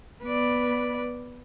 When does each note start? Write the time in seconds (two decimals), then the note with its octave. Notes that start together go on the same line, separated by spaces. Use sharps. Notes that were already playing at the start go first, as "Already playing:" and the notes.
0.24 B3 B4 D5